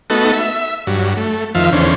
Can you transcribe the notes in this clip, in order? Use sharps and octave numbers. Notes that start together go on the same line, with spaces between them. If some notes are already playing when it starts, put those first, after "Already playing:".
A3 B3 D#4 F#4 A4
E5
G2 F#3
A3
F2 D#3 F3 E5 F5
E2 D3 C#4 C5